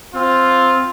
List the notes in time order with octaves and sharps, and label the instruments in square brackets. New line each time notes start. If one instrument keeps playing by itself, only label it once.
[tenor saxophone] C4 [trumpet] F4